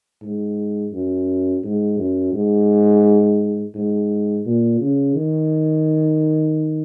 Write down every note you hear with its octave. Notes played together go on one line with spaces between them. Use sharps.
G#2
F#2
G#2
F#2
G#2
G#2
A#2
C#3
D#3